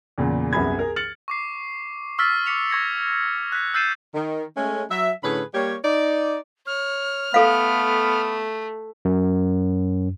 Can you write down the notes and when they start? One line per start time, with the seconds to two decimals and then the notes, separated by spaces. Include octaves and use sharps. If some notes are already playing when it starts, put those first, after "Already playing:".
0.18 E2 A#2 C#3
0.53 C2 F#2 B3 G#4 B5 G#6
0.79 G#4 A#4
0.96 F6 A6 C#7 F#7
1.28 C#6 D6 C7
2.18 C#6 E6 F6 A6 B6
2.46 D6 B6 C#7 F7
2.70 C#6 G#6 A#6 C#7
3.52 F#6 B6
3.74 E6 G6 A6 C7 D#7 E7
4.14 D#3
4.57 G#3 A3 C#4
4.90 F#3 E5
5.23 A2 D3 C#4 G#4 B4 B5
5.54 G3 A#3 G4 C#5
5.84 D#4 D5
6.67 C#5 F6
7.34 A3 B3 A4 F5
9.05 F#2